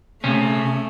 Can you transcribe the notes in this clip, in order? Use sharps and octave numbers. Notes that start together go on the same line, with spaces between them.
C3 A3 C#4